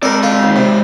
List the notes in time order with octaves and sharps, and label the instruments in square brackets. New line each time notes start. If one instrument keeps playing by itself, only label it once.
[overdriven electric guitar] G#3 D5 [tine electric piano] C4 [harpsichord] A4 A#4
[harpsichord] F4 A4
D#2
C3